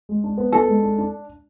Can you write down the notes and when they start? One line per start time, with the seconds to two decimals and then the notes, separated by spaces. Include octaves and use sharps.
0.09 G#3
0.24 D4
0.38 B3
0.52 D4 A4
0.68 G#3
0.83 D4
0.98 D4